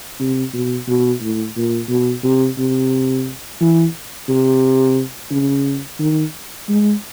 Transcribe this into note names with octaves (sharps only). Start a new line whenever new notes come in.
C3
B2
B2
A2
A#2
B2
C3
C3
E3
C3
C#3
D#3
G#3